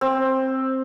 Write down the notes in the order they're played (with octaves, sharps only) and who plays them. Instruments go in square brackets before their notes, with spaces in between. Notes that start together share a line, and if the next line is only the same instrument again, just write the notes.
[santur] C4